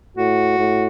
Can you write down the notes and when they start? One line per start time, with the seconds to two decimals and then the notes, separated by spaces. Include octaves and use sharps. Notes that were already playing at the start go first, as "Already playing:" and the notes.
0.17 A2 F#4
0.59 A2